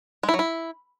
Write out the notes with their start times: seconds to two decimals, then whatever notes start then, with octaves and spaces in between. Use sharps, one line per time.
0.23 G#3
0.29 E4
0.34 F#3
0.39 E4